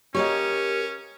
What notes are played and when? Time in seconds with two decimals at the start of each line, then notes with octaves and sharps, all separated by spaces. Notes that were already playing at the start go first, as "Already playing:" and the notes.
0.14 C#4 G4 A#4 C#5 D#5 F5